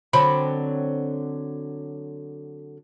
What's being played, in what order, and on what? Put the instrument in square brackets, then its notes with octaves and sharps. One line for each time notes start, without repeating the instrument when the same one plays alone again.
[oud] D3 F#3 C4 [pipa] B5